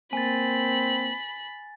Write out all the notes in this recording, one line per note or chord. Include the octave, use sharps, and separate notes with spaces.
A#3 C4 G#5 B5 A6